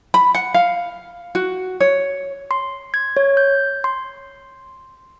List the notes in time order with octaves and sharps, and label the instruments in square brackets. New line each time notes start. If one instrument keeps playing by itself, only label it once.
[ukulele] B5
F#5
F5
F#4
C#5
[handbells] C6
G#6
C#5
G6
C6